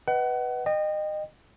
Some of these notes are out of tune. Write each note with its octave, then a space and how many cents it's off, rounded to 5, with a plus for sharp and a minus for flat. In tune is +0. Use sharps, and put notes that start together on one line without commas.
B4 +0 D#5 +0 F#5 +30
D#5 -25 G5 +10